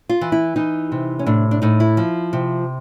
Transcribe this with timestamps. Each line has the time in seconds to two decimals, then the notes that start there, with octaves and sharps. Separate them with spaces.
0.09 F4
0.21 E3
0.32 E4
0.56 E3 D#4
0.92 C3
1.19 C#4
1.26 A2 D4
1.51 D4
1.62 A2 D#4
1.80 E4
1.97 F3
2.33 C3